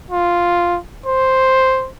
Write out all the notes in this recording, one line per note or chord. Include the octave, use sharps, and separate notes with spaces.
F4
C5